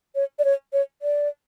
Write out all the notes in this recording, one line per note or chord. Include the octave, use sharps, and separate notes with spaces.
C#5
D5
C#5
C#5
D5